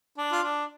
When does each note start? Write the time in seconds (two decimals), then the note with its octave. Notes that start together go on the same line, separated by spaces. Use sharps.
0.18 D4
0.32 F4
0.43 D4